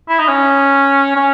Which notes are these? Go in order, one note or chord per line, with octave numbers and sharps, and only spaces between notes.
E4
D#4
C#4
C#4